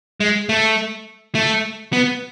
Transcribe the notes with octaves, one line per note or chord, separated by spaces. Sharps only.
G#3
A3
A3
B3